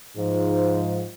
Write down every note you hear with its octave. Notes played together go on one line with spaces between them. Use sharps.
G#2 F3